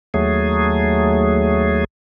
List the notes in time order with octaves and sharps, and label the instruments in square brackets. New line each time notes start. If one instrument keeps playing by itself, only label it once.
[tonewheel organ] D#2 F#3 A3 G#4